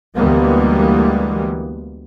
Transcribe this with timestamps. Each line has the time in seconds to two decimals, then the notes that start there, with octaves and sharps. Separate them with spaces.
0.15 D2 E3 G3 G#3 A#3 B3